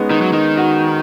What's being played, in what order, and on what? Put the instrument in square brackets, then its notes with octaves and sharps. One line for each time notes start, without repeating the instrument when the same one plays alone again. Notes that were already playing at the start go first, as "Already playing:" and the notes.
Already playing: [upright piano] G#3 B3 C#4 D#4
[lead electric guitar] D#3 [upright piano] D#4
[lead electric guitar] F#3
[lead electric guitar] D#3 [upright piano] D#4
[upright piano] F#4